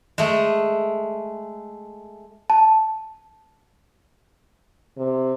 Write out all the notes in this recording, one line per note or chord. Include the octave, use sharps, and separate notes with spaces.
G#3 A3
A5
C3